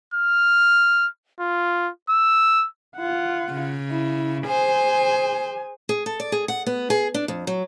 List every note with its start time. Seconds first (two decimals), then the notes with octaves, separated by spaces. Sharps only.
0.14 F6
1.40 F4
2.10 E6
2.97 F4 F#5
3.51 C#3
3.90 E4
4.47 G#4 C5 G#5
5.89 G#4
6.06 A4
6.20 D5
6.32 G#4
6.48 F#5
6.66 B3
6.90 G#4
7.14 D4
7.28 F2
7.47 F#3